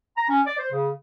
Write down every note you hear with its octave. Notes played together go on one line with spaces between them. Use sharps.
A#5
C#4
D5
C5
C#3